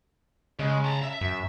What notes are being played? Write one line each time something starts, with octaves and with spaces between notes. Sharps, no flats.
C#3 G#3
A5 A#5
E5
F#2